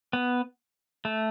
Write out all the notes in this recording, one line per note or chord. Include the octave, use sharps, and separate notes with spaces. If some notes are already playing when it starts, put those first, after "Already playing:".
B3
A3